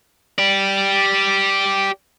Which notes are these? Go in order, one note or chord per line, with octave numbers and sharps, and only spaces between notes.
G4 D5